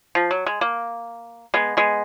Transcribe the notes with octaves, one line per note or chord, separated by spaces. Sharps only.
F3
F#3
G#3
A#3
G#3 B3
G#3 B3